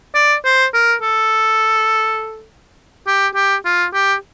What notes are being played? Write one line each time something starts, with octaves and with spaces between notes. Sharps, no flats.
D5
C5
A#4
A4
G4
G4
F4
G4